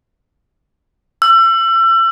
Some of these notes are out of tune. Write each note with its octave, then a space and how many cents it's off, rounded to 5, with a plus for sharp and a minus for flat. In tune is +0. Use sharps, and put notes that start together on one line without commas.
E6 +35